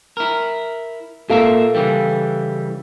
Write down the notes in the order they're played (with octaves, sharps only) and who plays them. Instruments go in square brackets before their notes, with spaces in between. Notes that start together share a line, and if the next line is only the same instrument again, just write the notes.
[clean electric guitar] E4 A#4
[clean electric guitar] A#2 A#4 E5 [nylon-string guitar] A4 F5
[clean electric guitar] C#3 E3 G3